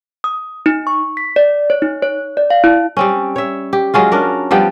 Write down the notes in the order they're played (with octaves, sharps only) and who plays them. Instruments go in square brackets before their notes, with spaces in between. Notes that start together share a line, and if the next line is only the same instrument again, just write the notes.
[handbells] D#6
D#4
C#6
B6
D5
C#5
D#4
C#5
D5
F5
E4
[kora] G3 C4 C#4
C#5 E5
G4
F#3 G#3 C#4 F4
C#4 D4 A#4
F3 G3 B3 G5